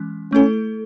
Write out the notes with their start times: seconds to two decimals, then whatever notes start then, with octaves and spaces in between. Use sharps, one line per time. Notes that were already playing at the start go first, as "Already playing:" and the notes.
Already playing: E3 G#3 C#4
0.32 A3 C#4 E4 A4